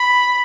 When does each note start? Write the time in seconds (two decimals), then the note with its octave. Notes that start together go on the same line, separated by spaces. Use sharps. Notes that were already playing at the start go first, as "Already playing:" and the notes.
Already playing: B5